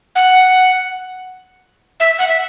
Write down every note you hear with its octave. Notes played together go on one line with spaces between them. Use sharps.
F#5
E5
F#5
E5